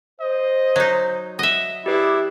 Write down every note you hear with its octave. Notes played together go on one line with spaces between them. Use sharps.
C5 D#5
F#3 D#4
D#5 E5 F#5
E4 G4 G#4 B4 D5 D6